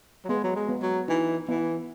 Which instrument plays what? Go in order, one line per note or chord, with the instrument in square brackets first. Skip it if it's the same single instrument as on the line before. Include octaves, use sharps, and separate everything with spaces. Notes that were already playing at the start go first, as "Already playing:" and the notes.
[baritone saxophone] F#3
[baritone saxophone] G#3 [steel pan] B3
[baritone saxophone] F#3
G#3
[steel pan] B3
[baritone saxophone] F#3
[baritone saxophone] E3 [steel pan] D#4
[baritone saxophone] E3 [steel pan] B3